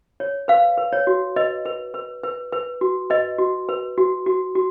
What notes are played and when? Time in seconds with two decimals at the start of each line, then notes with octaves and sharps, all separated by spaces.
0.20 C#5
0.48 B4 F5
0.77 B4
0.93 C#5
1.07 F#4
1.36 B4 D#5
1.65 B4
1.94 B4
2.23 B4
2.52 B4
2.81 F#4
3.10 B4 D#5
3.39 F#4
3.69 B4
3.98 F#4
4.26 F#4
4.55 F#4